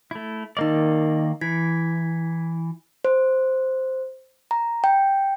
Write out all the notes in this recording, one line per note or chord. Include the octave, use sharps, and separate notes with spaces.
A3 E4
D#3 A#3 D#4 D5 D#5
E3 E4 G#6 B6
C5
A#5
G5